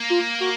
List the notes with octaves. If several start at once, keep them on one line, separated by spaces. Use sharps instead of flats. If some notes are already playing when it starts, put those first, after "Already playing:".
Already playing: A#3
F4
F#4